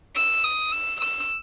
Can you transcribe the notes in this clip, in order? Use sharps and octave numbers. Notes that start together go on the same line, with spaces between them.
E6
D#6
E6
E6